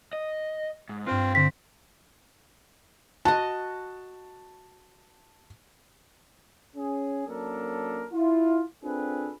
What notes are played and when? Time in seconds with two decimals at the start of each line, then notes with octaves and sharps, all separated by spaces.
0.13 D#5
0.89 G#2
1.06 G2 C4 F4 B4 G5
1.35 D3 C4 A#6 B6
3.25 F#4 D#5 A5
6.76 C#4 G#4
7.27 F#3 A#3 C#4 D4 A4 A#4
8.13 E4 F4
8.84 C4 D4 F4 G#4 A4 B4